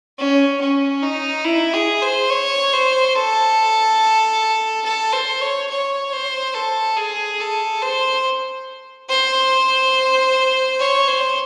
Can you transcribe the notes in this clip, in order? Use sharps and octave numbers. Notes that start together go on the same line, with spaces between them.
C#4
C#4
D#4
E4
G#4
C5
C#5
C5
A4
A4
C5
C#5
C#5
C5
A4
G#4
A4
C5
C5
C#5
C5